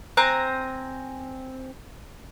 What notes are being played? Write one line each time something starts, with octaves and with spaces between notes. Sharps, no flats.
C4 G#5 A#5 F#6